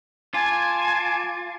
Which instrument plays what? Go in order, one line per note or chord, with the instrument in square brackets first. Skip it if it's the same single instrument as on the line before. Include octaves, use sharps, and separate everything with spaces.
[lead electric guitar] F4 [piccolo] G#5 [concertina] A5 D6